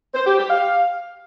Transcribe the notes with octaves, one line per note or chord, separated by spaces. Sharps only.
C5
G4
G4
F5